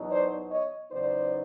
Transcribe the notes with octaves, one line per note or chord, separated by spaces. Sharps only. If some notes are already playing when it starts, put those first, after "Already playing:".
Already playing: E2 B2 F#3 B3 D#4
C5 D5
C#5 D#5
E2 C#3 F#3 B3 D#4 C5 D5